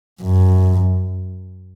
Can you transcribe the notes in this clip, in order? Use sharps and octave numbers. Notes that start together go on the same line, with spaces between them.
F#2